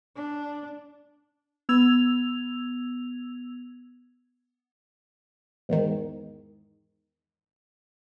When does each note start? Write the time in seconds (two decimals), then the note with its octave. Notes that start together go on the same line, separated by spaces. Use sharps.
0.16 D4
1.69 B3 E6 G#6 F7
5.69 E2 G#2 D#3